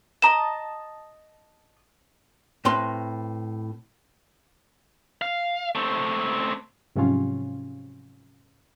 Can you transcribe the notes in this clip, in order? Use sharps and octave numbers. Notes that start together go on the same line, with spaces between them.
D#5 A5 A#5 D#6 E7
A2 C4 B4 C6
F5
A3 C4
G#2 C3 F3 F#3 C#4 F4